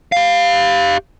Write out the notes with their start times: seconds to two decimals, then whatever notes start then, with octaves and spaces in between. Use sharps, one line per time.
0.12 G4 F5